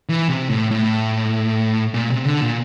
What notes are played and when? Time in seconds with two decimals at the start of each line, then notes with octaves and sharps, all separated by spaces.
0.09 E3
0.29 C3
0.49 A2
0.71 A2
1.94 A#2
2.10 C3
2.25 D3
2.42 A#2